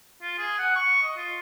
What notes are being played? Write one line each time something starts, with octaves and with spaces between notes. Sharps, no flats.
F4
G#4
F#5
C#6
D#5
F4